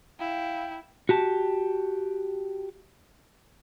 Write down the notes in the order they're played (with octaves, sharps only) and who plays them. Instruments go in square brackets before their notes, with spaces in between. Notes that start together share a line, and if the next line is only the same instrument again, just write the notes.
[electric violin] E4 [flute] F5 [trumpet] G5
[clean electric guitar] F#4 G4 A5